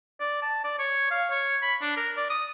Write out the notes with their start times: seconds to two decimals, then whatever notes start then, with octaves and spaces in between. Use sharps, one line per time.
0.20 D5
0.42 A5
0.64 D5
0.79 C#5
1.11 F5
1.30 C#5
1.62 B5
1.82 D4
1.97 A#4
2.17 D5
2.30 D#6